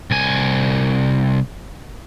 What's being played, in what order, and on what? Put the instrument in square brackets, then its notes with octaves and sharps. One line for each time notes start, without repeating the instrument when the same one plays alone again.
[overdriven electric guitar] C2 G#5